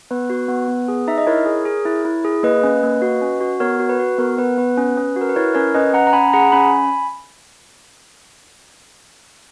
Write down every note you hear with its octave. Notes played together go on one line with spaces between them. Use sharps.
B3 B4
F#4
B3
B3
G#4
D#4 E5
D#5
E4 A#4 C#5
G#4
G#4
E4
E4
G#4
A#3 B4 D#5
C#4
A#3
F#4
C#4
F#4
B3 A#4 C#5
F#4
B4
F#4
B3 A#4
B3 B4
B3 B4
C#4
C#4
F#4
A#4
B4
E4 A#4 C#5
C#4 A#4 C#5
C#4 B4 D#5
C#4 F#5 A#5
A#5
C#4 G#5 B5
G#4 F#5 A#5
C#4 G#5 B5